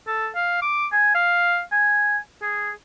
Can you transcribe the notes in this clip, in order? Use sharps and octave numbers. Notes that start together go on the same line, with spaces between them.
A4
F5
D6
G#5
F5
G#5
G#4